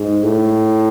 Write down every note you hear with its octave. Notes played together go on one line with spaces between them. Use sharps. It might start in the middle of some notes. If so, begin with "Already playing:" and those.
Already playing: G#2
A2